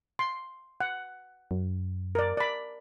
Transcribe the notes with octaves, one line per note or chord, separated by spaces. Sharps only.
C6
F#5
F#2
A#4 D5
D5 B5